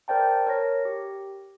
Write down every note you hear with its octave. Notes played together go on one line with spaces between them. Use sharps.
A#4 C5 D5 G5 A5
A#4 C#5 A#6
G4